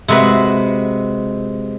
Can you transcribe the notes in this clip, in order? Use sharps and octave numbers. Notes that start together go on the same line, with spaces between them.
C3 G#3 F#4 B4